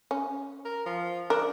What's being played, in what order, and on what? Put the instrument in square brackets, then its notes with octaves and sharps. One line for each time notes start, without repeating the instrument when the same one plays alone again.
[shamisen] C#4
[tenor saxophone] A#4
F3
[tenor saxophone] D4 [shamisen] A#4